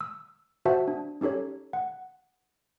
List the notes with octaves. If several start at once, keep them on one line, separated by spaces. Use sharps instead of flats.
E6
F#4 C5 E5 F#5 A5 E6
D4
C#4 D#4 G4 A4 C#5
F#5